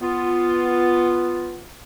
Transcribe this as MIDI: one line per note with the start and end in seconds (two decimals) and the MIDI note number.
0.02 1.62 59
0.02 1.62 65